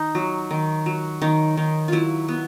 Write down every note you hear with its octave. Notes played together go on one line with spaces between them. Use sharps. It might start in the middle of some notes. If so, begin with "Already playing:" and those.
Already playing: D#3 D#4
F#3
D#3
F#3
D#3 D#4
D#3
F#3 E4 F4
B3